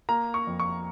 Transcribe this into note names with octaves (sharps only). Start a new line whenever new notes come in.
A#3 A#5
C#6
F2
C#6